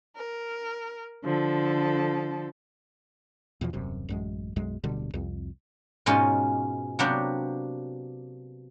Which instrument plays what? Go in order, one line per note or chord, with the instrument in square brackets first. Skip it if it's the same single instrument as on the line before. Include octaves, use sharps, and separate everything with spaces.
[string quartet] A#4
D3 F3 A4
[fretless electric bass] E2 B2 D3 F3
D#1 F#2 C3
A1 F#2 G#3
B1 F#2 G#3
D1 B2 D3 G3
C2 F2
[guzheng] G#2 B2 G#3 C#4 D#4 F4
C3 F#3 A#3 B3 D4 G4